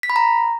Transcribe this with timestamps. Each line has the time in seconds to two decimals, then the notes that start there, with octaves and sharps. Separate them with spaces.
0.03 B6
0.10 B5
0.16 A#5